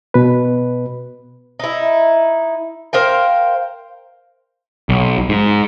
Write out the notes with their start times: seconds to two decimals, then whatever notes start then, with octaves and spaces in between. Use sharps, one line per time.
0.14 B2 B4
1.59 D#4 E4
2.93 A#4 C5 F5 G5
4.89 B1
5.29 G#2